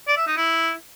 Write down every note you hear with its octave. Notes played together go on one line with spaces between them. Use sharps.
D5
E5
D#4
E4